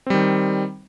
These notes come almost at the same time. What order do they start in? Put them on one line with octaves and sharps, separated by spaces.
C4 G3 D#3